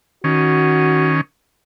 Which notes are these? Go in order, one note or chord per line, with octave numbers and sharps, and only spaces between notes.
D#3 C#4 F#4